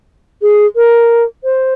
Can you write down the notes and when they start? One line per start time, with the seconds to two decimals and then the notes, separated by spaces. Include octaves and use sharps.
0.42 G#4
0.76 A#4
1.44 C5